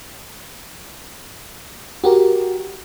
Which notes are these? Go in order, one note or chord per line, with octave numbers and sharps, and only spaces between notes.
F#4 G4 A#4